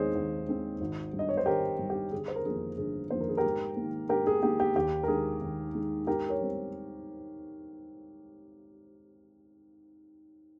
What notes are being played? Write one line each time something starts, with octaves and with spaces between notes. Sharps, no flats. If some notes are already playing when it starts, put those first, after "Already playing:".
Already playing: D#2 D#3 G#3 C4 G#4 C5 C#5 D#5
D#2
D#3 G#3 C4
G#1
G2 D#3 G3
D#5
C#5
C5
G#1 G4 A#4
G2 D#3 G3
G4
G1 G#4
C5
A#4
F2 D#3 A#3 G#4
G1 G#4
F2 D#3 A#3 C5
A#4
G#4
G4 A#4
G#2
D#3 A#3
G#2 G4 A#4
G#4
D#3 A#3 G4
G4
D#2 G4
A#4
D#3 G#3 G#4
D#2
D#3 G#3
G#2 G4 A#4
A#4 C#5
G3 C4